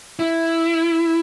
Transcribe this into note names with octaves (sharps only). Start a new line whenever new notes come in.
E4